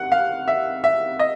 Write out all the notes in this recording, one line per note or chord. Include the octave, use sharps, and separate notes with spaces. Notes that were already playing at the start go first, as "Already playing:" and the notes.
Already playing: F#5
F5
E5
E5
D#5